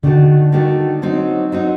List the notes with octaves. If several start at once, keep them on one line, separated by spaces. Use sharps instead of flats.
D3 D#3 A3 D4 F#4 A4
D#3 A3 D4 F#4 A4
F#3 C4 D#4
F#3 C4 D#4